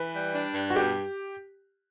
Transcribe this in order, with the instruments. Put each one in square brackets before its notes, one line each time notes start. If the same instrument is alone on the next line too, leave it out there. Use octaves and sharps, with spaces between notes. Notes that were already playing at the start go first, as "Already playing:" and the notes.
Already playing: [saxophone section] E3 [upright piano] B4
[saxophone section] G3
D4
G2
[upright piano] F#4
[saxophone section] B2 [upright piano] G4